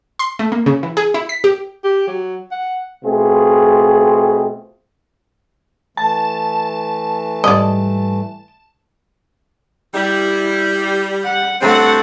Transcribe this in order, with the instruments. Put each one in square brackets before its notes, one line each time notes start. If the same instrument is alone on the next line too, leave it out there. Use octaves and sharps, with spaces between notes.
[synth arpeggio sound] C6
A3
A#3
C#3
E3
G#4
E4
B6
G4
[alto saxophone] G4
F#3
F#5
[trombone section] B2 A3 C4 F4 G#4
[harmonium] E3 A3 [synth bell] A5
[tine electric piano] G#2 G3 [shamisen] D5 D#5
[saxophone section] G3 [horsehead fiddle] E4
[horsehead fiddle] F#5
[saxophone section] G2 F#3 C4 [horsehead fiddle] A3 F#5